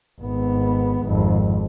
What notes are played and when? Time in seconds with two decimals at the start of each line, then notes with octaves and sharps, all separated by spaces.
0.20 G#1 B3
1.04 G#1 F2